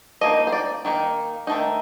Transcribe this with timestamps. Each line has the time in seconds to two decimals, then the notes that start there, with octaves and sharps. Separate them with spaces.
0.21 F3 A#3 D#4 D#5
0.47 C5
0.52 D5
0.85 D#3 A#3 D#4
1.47 D#3 A3 D#4